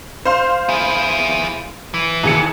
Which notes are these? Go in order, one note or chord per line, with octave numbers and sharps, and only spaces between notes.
C5 F5 C6
E4 G#4
E3
D#2 G#4 C#7